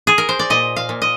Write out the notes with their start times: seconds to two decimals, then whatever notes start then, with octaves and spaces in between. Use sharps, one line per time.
0.07 G#4
0.18 A#4
0.29 C5
0.39 D5
0.50 A#2 D#5
0.76 F5
0.89 A#2
1.02 D#5